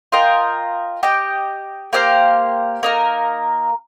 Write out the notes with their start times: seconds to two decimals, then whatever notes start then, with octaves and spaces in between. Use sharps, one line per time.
0.12 F4 A#4 D#5 G5
1.03 G4 D#5 G5
1.93 A#3 G4 C5 F5
2.83 A#3 D#4 A#4